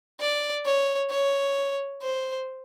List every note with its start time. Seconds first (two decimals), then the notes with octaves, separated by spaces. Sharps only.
0.20 D5
0.66 C#5
1.10 C#5
2.03 C5